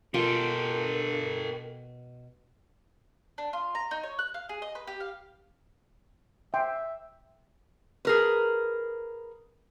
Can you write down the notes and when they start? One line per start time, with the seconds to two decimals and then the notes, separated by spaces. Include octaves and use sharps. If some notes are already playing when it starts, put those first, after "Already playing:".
0.14 B2 F4 G4 A4 A#4
3.38 D4
3.53 F4
3.75 A#5
3.91 D#4
4.03 C#5
4.19 F#6
4.34 F5
4.49 G#4
4.62 D#5
4.75 B4
4.87 G4
5.00 F5
6.54 E5 G5 C6
8.05 G#4 A#4 B4